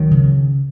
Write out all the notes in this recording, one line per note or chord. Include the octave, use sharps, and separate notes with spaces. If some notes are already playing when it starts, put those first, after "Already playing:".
Already playing: C#2 D#3 F#3
C#3